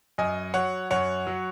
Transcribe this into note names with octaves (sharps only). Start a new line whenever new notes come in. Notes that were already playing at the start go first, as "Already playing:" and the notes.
F#2 D#5 G#5
F#3 C#5 F#5
F#2 C#5 F#5
F#3